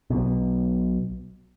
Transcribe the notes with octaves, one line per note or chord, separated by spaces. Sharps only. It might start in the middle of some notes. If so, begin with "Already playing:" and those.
B1 B2